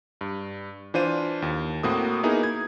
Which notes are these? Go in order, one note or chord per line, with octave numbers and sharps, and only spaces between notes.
G2
E3 D4 F4 C5 F5 D#7
D#2
A2 A#3 C4 F#4 D#6
A#3 B3 D#4 E4 G#4 A#4
G#6